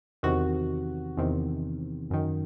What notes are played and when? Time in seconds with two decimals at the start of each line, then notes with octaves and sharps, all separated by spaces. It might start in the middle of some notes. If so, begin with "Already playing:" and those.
0.23 E2 C3 D#3 F#4
1.17 E2 C3 D#3
2.10 F#2 D#3